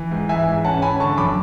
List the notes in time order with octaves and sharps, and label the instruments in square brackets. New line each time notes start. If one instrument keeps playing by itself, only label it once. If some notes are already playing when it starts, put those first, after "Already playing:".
Already playing: [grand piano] E3
G#2
E3 E5 G#5
G#2
C#4 F#5 A5
C#4 G#5 B5
D3 A5 C#6
F#2 B5 D6